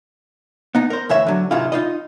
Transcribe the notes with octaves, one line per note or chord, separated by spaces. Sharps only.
B3 D#4
A#4 C5
D2 E3 C#5 E5
D3 F#3
G#2 C3 D#3 G#3 E4 F4
D#4 F4 D#5